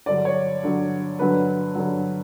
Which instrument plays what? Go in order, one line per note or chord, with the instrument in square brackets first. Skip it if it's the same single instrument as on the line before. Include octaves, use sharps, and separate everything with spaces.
[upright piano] G2 D3 F#3 D5
C#5
G2 D3 F#3
G2 D3 F#3 B4
G2 D3 F#3